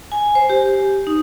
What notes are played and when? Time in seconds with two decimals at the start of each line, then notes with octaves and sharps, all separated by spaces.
0.12 G#5
0.35 C5
0.50 G4
1.07 D#4